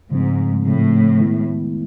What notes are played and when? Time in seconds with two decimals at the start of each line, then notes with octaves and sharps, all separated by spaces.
0.10 G#2 C#3 F3 A3 C4
0.65 A2 C#3 F3 A3 C4
1.19 D#3 G#3 B3 E4